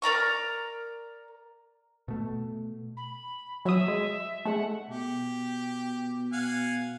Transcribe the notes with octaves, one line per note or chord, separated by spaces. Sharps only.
A#4 D5 A#5 C#6
B2 A3
B5
F#3 E5 D#6
G#3
G#3 A3 F#5
B2 G4
F5 F#5 G#5